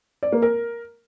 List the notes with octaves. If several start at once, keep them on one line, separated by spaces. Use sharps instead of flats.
D5
A#3
A#4